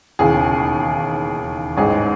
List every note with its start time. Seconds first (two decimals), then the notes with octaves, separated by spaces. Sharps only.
0.19 E1 D#2 C#3 E3 G#4
1.77 A1 G#2 E3 G#4